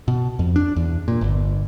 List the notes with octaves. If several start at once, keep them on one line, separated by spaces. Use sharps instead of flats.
B2
F2
D4
E2
A#2
G1